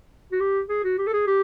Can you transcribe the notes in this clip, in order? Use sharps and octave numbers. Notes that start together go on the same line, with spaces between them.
F#4
G4
G#4
F#4
G4
A4
G#4
G4